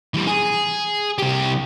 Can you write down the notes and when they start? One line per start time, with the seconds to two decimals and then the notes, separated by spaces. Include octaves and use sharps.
0.14 E3 G3
0.27 G#4
1.18 C2 G4